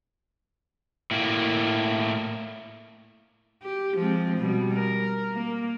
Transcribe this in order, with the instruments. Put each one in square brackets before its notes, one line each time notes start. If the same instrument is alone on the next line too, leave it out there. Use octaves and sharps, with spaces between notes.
[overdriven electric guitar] A2 A#3
[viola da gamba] G4
F3 G#3 C4
B2 G3
A#4
A#3